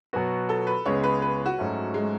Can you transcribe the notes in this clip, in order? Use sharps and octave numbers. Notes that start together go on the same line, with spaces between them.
B2 F#3 B3 F#4
A4
B4
C#2 C#3 G#3 B3 C#5
B4
B4
F#4
G#2 F#3 A3 C#4
G#3